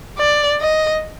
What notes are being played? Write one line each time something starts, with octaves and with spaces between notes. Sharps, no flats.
D5
D#5